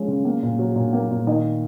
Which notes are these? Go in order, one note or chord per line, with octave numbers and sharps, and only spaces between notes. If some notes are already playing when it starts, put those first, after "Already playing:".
Already playing: F3 G#3 C#4
C#3
A#3
A#2
F#3
A#2
A#3
A#2
D#3 D#5